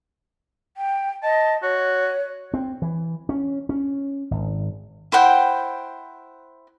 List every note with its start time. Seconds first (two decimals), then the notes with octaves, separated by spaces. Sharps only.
0.77 G5
1.23 D#5 A5
1.63 F#4 C#5
2.54 C4
2.82 E3
3.29 C#4
3.69 C#4
4.31 G#1
5.12 E4 C5 F#5 G5